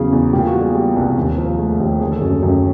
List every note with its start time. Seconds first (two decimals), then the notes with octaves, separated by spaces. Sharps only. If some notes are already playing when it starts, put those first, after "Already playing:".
Already playing: E2 C#3 F#3 G#4
0.13 E2
0.33 A#2 G4
0.47 F#4
0.54 G3
0.61 G#4
0.75 G3
0.96 C2
1.17 D#2
1.38 F3
1.58 A3 G#4
1.80 D#2 G4
2.01 D3 G#4
2.12 A4
2.21 F#2 G#4
2.42 F#2 G4